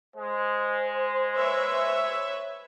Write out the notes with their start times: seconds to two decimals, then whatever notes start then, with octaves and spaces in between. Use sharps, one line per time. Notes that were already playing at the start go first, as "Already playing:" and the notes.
0.16 G#3 C5
1.37 B4 C#5 E5